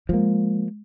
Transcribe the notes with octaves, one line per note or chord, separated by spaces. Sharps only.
F3 G#3 A#3